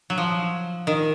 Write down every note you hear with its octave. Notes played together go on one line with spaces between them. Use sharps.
F#3
F3
D#3